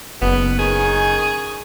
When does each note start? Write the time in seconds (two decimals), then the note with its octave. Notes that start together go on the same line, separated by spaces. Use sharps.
0.21 F#1 B2 B3
0.59 D#3 C#4 G#4